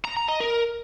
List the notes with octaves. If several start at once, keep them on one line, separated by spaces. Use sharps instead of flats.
A#5
A#5
D#5
A#4